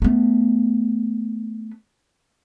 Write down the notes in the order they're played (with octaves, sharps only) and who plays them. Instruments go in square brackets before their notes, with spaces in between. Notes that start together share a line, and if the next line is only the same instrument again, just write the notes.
[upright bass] A3 B3